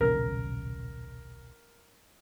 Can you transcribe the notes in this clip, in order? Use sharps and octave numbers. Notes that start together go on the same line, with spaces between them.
D#1 B1 C#3 A#4